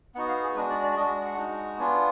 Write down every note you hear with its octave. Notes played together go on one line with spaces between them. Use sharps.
B3 D#4 F#4 F#5
F5
G#4
G#3 D4 F#4 B4
D5
D5
G#3 D4 F#4 D#5
F#5
G#3 D#4 F#4
B3 D4 F4 G#5